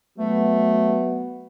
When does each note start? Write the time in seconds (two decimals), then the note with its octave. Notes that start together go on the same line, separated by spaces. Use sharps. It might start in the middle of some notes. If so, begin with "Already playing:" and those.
0.18 F#3 A3 B3